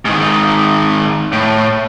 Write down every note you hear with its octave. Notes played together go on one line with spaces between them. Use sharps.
G#2 D#3
A2